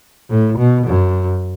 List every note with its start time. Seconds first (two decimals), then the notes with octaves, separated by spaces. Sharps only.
0.30 A2
0.58 B2
0.86 F#2